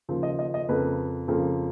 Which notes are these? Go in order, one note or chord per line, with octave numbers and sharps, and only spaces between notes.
D#2 C#3 F3
D#5
D#5
D#5
F2 C#3 F3 A#3 B4
F2 C#3 F3 A#3